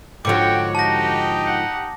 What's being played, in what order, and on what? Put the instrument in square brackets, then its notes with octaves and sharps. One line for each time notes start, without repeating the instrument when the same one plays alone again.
[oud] G#2 D3 F3 [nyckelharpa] F#4 C#5 [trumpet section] G5 [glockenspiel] D6
[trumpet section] D#4 G4 [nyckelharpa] F#4 [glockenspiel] A5 A#6
[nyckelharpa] F#5